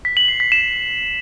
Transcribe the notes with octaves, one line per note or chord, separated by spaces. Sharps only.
B6
F#7
C7
B6
E7